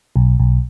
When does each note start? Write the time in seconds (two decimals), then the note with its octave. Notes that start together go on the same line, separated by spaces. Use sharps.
0.16 B1
0.40 B1